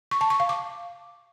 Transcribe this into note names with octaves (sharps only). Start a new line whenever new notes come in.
C#6
A5
C#6
F5
D6